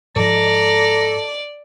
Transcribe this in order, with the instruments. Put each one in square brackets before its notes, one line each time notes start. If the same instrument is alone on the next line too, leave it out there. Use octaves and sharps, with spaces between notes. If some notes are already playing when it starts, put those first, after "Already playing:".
[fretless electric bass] G#2 F3 [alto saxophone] A4 [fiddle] D5 [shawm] A#5